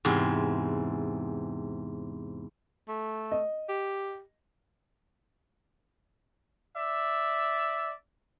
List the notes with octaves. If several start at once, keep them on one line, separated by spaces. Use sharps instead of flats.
E2 G#2 C3 C6
A3
D#5
G4
D5 E5